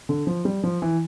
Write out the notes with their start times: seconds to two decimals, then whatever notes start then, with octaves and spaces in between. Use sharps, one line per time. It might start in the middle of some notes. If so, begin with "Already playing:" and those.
0.09 D3
0.27 F3
0.45 G3
0.63 F3
0.82 E3